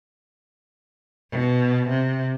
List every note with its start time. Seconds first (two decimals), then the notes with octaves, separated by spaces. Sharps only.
1.32 B2
1.90 C3